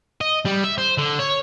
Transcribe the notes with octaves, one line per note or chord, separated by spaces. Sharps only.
D#5
G3
E5
C5
D3
C#5